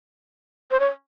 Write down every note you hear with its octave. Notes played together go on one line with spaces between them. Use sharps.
C5
C#5